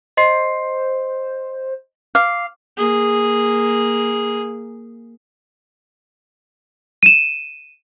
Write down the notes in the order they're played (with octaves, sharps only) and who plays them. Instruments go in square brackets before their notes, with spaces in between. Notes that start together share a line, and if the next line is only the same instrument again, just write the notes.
[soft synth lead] C5 [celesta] D#5 C6 C7
[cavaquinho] F5 [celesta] D6
[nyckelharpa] A#3 G#4
[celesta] D#7 E7